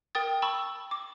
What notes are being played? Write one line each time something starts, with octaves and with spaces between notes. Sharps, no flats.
A#4 G5 D#6 A6
A5 B5 C#6 E6
D6